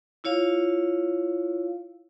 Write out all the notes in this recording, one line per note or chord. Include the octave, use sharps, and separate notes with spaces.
E4 F4 C#5 F5